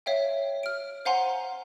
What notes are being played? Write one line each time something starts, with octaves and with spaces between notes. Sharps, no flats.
C#5 E5 F5 G5
F6 D7
C5 F5 F#5 G#5 A#5 C6